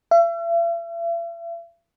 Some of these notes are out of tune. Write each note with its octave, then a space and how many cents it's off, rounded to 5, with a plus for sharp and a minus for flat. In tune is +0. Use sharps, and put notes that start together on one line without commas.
E5 +45